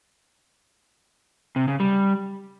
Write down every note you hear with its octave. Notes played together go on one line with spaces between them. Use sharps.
C3
C#3
G3